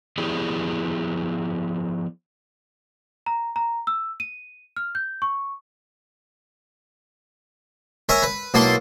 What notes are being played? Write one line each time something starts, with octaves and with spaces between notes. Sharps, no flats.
F3 B3 E4 G4 G#4 D5
A#5
A#5
E6
D#7
F6
G6
C#6
A#4 C#5 E5 G#5 A#5
B4
B1 A#3 E4 A5 C6